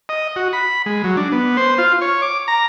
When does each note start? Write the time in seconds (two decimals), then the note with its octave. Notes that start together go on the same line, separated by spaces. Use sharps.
0.09 D#5
0.36 F#4
0.53 B5
0.86 G#3
1.04 F#3
1.17 D4
1.32 B3
1.57 C5
1.78 F4
2.01 C#5
2.22 D6
2.48 A#5